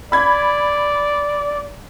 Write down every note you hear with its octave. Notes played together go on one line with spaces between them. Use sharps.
D5 B5 G#6